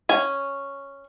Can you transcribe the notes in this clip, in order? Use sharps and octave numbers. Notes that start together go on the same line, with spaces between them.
C#4 G#5